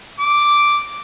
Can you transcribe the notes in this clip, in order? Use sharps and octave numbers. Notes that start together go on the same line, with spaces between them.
D6